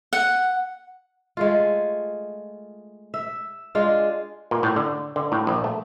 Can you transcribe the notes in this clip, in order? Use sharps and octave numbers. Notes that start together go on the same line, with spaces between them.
F#5
G#3 A3 F4
E5
G#3 D4 F4
A#2
A2
D3
D3
A2
A#1
A3